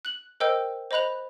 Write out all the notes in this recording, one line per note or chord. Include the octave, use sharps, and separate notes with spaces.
F#6 F#7
A#4 C5 D#5 G5 E6 G6
C5 D#5 B5 F#6 F7